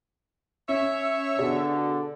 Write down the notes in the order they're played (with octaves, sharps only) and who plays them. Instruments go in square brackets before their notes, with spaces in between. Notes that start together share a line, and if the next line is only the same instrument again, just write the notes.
[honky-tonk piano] C#4 [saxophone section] C#5 E5
[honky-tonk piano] B2 G#4 D5 [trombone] D3